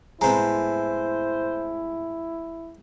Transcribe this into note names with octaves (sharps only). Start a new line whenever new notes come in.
A2 G#3 B3 C4 E4 C5 A#5